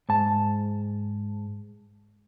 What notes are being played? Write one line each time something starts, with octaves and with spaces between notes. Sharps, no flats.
G#2 A5